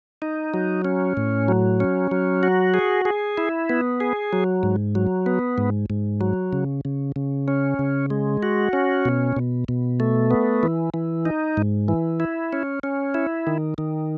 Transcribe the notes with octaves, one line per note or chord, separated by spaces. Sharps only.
D#4
F#3
C#4
A2
F#3
C#4
F#3
F#4
G#4
G#4
E4
B3
G#4
F#3
G#2
F#3
B3
G#2
G#2
F#3
C#3
C#3
C#3
C#4
C#3
G#3
F#4
C#4
B2
B2
B2
A3
B3
E3
E3
D#4
G#2
E3
E4
C#4
C#4
E4
D#3
D#3